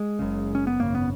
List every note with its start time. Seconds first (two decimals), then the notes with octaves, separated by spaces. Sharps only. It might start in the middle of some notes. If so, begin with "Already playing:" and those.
Already playing: G#3
0.19 F#1 F#2 C#3
0.55 C#4
0.67 B3
0.79 G#1 F#2 C#3 A#3
0.95 B3